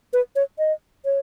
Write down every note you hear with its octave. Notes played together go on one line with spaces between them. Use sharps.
B4
C#5
D#5
C#5